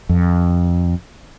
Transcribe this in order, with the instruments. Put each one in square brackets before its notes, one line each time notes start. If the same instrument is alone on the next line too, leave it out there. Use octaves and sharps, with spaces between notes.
[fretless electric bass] F2